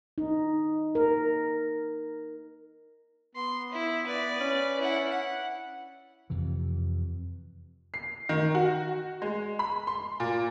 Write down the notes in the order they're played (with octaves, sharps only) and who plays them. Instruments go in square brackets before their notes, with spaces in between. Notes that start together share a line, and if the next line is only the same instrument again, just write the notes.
[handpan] D#4
A#4
[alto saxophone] B3 [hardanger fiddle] C6
[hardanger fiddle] E4
B4 D5
[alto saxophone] C#4
[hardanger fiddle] E4 F#5
F#5
[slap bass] F2 C3 E3
[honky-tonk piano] C7
D#3
F#4
G#3
B5
C6
A#2